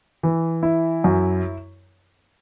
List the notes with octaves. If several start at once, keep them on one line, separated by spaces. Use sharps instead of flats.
E3
E4
F#2